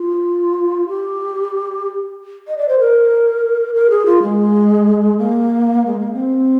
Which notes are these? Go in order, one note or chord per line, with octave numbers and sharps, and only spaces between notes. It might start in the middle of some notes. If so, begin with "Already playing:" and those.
Already playing: F4
G4
D#5
D5
C5
A#4
A#4
G#4
F4
G#3
A#3
G#3
A#3
C4